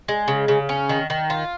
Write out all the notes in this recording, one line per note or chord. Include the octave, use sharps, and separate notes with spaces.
G#3
C#3
C#3
C#4
D#3
D#3
F4